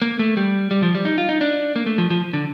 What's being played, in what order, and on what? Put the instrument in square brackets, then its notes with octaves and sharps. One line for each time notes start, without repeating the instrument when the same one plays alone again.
[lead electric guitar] A#3
A3
G3
G3
F3
G3
D#4
F4
D#4
D4
A#3
A3
F3
F3
D3